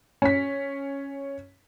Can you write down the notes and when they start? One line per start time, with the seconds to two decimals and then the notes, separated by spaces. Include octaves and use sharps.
0.22 C#4 B6